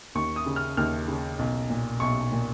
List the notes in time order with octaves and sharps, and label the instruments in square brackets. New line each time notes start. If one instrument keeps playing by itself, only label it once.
[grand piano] D#2 C#6
D#6
C#3
F6
D#2 F6
C#3
B1
A#2
B1 C#6
A#2